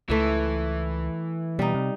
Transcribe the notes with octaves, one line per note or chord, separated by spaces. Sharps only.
C#2 E3 A3 E4
B2 G3 D#4
C3